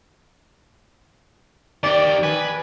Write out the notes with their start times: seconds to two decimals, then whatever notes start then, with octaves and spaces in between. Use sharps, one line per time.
1.84 D#3 G4 D5
2.23 B4 G#5